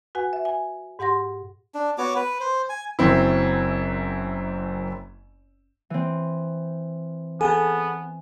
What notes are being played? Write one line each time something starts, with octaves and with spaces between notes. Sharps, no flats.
F#4 B4 F#5 G#5
E5
G#5
G#2 G4 F#5 C6 A#6
D4
B3 F#4 C#5 D6
B4
C5
G#5
F#1 F#2 C4 E4
E3 C4
B3 G#4 A4 G#5